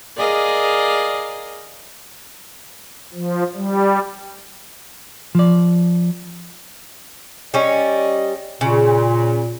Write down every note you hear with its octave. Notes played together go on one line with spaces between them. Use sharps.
G#4 A#4 D5 D#5 F5
F3
G3
F3 D5
G3 C#4 D5 D#5
A#2 C#3